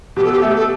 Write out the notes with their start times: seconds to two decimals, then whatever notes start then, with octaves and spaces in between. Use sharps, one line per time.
0.16 B2 G4
0.25 A4
0.32 G4
0.40 A3 A4
0.48 G4
0.55 A4